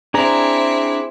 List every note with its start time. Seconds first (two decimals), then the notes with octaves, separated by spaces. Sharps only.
0.14 C4 D4 E4 G#4 A#5